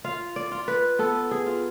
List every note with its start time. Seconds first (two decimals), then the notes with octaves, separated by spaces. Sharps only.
0.04 F4 F5
0.36 D5
0.52 F4
0.68 B4
0.99 B3 A4
1.31 G#4
1.46 F4